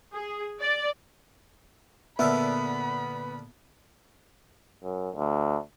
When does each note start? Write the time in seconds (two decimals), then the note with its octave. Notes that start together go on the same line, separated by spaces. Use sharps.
0.12 G#4
0.60 D5
2.19 A#2 D3 B3 A#4 E5 B5
4.83 F#2
5.15 D2